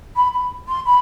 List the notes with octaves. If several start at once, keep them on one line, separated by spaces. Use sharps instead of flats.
B5
B5
C6
B5